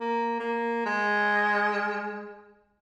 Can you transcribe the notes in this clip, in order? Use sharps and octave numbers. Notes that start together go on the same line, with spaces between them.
A#3
A#3
G#3